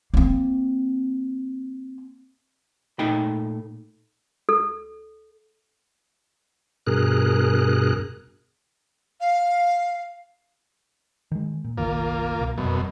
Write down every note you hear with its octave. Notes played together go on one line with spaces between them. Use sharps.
A#3 C4
A#2 A3 D#4 D#5 G5 B5
A4
G2 B2 G#4 A#4 F#6
F5
D#3 G#3
A#2
F#1 B1 D#3 A#3 F4
C2 B2
F1 F#2 B2